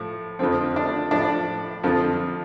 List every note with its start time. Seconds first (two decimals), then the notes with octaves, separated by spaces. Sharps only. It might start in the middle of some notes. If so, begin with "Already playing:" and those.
Already playing: A2 F3
0.39 F2 D3 F3 C4
0.76 D4
1.11 A2 F3 D4
1.83 F2 D3 F3